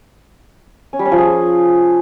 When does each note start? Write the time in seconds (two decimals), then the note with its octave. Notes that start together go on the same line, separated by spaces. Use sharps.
0.93 C#4
0.99 G3
1.05 C#4
1.12 F3
1.18 G#4